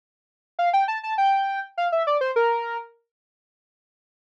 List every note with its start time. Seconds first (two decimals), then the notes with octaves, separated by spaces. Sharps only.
0.59 F5
0.73 G5
0.88 A5
1.03 A5
1.18 G5
1.78 F5
1.92 E5
2.07 D5
2.21 C5
2.36 A#4